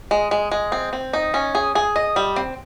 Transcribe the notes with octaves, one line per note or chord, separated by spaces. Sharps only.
G#3
G#3
G#3
C4
C4
D#4
C#4
G#4
G#4
D#5
G3
C4